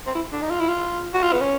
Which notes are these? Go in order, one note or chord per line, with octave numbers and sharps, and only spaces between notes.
C4
E4
D4
D#4
F4
E4
F4
F#4
F4
B3
C#4